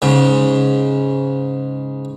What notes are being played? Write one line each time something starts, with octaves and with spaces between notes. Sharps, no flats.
G#2 C#3